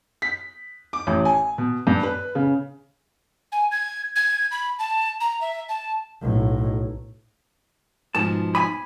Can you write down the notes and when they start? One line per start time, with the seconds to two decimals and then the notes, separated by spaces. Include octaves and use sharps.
0.22 B6
0.93 D6
1.07 A1
1.25 G#5
1.58 B2
1.87 G2
2.03 B4
2.35 C#3
3.52 G#5
3.71 G#6
4.16 G#6
4.51 B5
4.79 A5
5.20 A#5
5.41 E5
5.69 A5
6.22 B1 A2
8.15 G#2 B2 F3 A5
8.55 G#5 B5